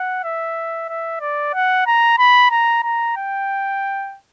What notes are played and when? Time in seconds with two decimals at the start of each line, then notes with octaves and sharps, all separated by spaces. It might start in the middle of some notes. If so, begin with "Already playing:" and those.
Already playing: F#5
0.24 E5
0.89 E5
1.21 D5
1.54 F#5
1.87 A#5
2.18 B5
2.51 A#5
2.83 A#5
3.17 G5